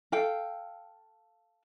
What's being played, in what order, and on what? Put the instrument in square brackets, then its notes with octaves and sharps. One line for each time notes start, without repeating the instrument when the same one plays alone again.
[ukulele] A4 F5 G5